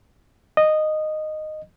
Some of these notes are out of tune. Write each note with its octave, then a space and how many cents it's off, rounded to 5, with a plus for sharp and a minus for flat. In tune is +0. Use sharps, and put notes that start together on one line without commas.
D#5 -10